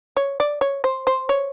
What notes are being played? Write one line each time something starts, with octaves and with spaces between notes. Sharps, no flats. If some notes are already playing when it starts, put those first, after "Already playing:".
C#5
D5
C#5
C5
C5
C#5